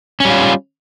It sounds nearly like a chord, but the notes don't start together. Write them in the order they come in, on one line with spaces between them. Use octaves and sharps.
C#4 G3 F4